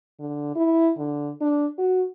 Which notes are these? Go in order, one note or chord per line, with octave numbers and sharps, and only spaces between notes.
D3
E4
D3
D4
F#4